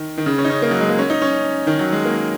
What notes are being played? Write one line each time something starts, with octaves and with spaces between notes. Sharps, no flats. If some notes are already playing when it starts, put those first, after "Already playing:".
Already playing: D#3
D#3
C#3
C#4
D#4
C#4
A#3
F#3
G#3
A#3
C#4
D#4
C#4
D#3
F#3
G#3
A#3